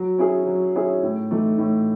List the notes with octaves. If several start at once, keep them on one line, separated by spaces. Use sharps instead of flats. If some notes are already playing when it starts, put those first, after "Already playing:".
Already playing: F#3
C#4 E4 G#4
F#3
C#4 E4 G#4
A2
E3 A3 D#4
A2